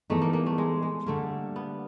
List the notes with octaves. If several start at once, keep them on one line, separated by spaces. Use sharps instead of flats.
E3 G3 A3 B3 D#4 G#4
A#3
A#3
A3
G#3
G#3
D3 G3 A3 A#3
B3